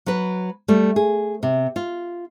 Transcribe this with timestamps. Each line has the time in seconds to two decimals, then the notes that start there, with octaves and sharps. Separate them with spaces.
0.06 F#3 B4
0.68 G3 A3
0.96 G#4
1.43 C3
1.76 F4